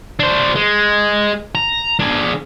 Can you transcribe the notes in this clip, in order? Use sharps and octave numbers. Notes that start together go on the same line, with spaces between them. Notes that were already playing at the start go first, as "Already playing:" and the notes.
D4 C5
G#3
A#5
D4 G#4